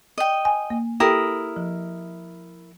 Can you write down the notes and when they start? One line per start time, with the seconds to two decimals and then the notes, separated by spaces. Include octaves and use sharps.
0.18 D#5 G5
0.45 G#5
0.70 A#3
1.00 E4 G4 A4 A#4 G5 D#6
1.56 F3